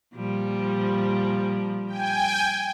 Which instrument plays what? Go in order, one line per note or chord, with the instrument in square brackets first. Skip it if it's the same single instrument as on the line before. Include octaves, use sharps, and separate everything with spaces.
[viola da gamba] A#2 F3 G3
[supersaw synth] G5 G#5